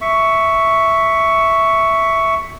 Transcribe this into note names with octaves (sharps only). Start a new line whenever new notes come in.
E5 C#6